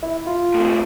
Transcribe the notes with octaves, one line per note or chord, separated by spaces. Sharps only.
E4
F4
A2 C3